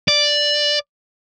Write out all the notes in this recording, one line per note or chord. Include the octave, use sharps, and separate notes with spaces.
D5